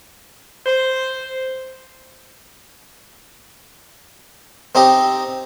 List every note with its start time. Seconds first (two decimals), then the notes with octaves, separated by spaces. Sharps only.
0.66 C5
4.75 C4 D#4 G4 D#5